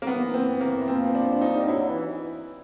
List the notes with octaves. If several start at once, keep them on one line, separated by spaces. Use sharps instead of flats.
A#3
E3 B3
C4
A#3
E3
F3 C4
D4
D#4
G3
F#3 E4
E3